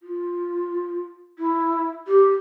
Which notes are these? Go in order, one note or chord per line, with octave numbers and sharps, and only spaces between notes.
F4
E4
G4